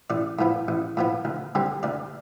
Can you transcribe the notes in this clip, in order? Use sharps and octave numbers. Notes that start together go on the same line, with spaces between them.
A1 D5
A2 F3 B3
A1
A2 F3 B3
D2
D3 G3 C4
D2 D5